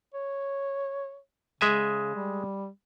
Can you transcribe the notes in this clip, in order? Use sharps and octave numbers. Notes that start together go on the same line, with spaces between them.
C#5
C#3 G#3 E5 G#5
G3